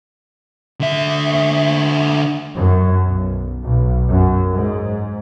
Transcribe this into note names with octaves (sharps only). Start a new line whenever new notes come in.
D3 E5
F#2
B1
B1
F#2
G#2